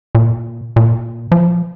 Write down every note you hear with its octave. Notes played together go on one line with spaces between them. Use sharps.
A#2
A#2
F3